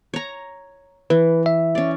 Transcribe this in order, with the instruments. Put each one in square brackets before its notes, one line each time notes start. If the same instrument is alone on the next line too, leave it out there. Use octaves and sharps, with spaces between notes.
[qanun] C#5 A#5
[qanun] E3 [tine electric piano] B4
[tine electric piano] E5
[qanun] C#4 D5